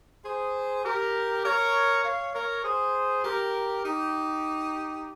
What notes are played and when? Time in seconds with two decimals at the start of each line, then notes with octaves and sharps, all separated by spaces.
0.24 G#4 C5
0.84 G4 A#4
1.44 A#4 C#5
2.04 C#5 F5
2.34 A#4 C#5
2.64 G#4 C5
3.24 G4 A#4
3.84 D#4 G4